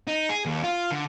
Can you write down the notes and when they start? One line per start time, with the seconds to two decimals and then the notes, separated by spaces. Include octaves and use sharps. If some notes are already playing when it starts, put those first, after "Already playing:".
0.07 D#4
0.29 G#4
0.45 D#2
0.64 F4
0.91 D3